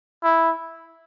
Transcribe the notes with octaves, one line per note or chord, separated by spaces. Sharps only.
E4